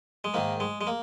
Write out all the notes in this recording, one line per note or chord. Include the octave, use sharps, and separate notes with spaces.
G#3
G#2 D#3 A#3
G#3
G#3
A#3